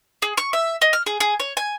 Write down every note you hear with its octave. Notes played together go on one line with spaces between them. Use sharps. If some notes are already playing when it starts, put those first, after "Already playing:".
G#4
C#6
E5
D#5
F6
G#4
G#4
C#5
G#5